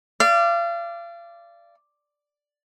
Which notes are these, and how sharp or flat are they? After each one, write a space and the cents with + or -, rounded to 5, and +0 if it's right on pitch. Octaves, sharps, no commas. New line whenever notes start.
D5 +0 F5 -35